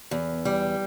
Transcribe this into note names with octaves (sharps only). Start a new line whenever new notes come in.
E2
G3